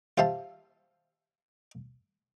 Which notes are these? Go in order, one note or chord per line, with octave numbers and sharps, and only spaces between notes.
F4 G4 C5 E5 F5 A5